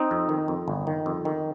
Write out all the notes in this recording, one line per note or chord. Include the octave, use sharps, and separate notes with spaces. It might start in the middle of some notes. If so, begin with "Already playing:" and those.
Already playing: C4 D#4
F2
D#3
F2
G1
D#3
F2
D#3